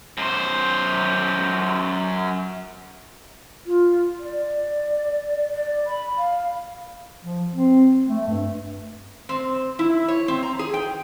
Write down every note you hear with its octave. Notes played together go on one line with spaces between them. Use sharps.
F#2 C5
F4
D5
D5
B5
F5
F3
C4
A3
G2
C4
E4
C#5
C4
A#5
G#4
G5